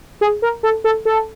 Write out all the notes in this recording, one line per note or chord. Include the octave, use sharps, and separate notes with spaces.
G#4
A#4
A4
A4
A4